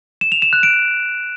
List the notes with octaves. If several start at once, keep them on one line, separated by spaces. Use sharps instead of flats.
E7
F7
E7
F#6
D7